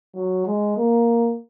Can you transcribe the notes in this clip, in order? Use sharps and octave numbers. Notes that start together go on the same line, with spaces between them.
F#3
G#3
A#3